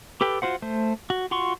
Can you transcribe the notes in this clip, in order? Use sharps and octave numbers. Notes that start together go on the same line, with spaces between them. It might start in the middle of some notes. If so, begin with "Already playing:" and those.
G4 A4 B4 G5
F4 F#4 C5 F#5
A3 C5
F#4
F4 F#4 F#5 C6 C#6